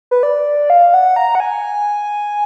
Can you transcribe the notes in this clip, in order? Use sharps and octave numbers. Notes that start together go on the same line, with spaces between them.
B4
D5
F5
F#5
A#5
F#5
G#5